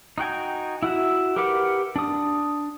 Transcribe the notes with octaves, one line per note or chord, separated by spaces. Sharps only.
D#4 F#4 G5 G#5
E4 F#4 E5
G4 A#4 B4 F#5 D6
D4 D#6